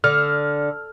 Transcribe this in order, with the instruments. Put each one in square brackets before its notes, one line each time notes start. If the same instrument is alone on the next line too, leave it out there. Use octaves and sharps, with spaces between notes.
[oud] D3 [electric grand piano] F6